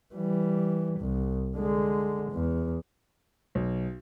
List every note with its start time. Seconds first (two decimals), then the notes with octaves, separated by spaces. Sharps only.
0.15 E3 G3
1.00 C2
1.57 D3 G#3
2.31 E2
3.55 B1